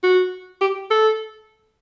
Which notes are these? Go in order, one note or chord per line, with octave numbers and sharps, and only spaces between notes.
F#4
G4
A4